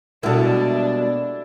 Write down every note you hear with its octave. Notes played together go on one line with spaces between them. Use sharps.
B2 G3 G#3 A#3 D4 E4 F#4 A4